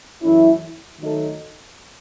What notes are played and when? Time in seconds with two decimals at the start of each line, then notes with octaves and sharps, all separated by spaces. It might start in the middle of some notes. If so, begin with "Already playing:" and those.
0.22 F#2 E3 A3 C#4 E4
0.99 D#3 F#3 A3 D#4 A4